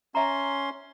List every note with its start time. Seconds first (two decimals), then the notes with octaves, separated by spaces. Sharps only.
0.15 C#4 E5 A#5 C6